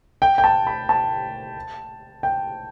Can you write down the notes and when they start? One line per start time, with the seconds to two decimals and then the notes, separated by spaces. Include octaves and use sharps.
0.22 G5
0.38 G5
0.44 A5
0.67 B5
0.89 A5
2.23 G5